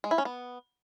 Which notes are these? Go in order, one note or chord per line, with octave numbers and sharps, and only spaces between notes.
G#3
E4
C#4
B3